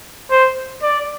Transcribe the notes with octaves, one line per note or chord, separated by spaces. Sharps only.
C5
D5